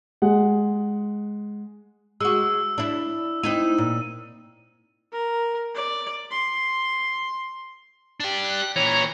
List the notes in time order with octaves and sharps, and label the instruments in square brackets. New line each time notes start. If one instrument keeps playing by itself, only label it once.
[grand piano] G#3 F#5
[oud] G#3 F#4 [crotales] E6
[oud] D4 E4
[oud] C4 D#4 E4 [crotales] D#7
[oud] A#2
[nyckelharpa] A#4
D5
C6
[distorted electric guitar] D4 G4
[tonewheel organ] F#6
[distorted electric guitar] A#2 E3 [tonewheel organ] C#5 A#5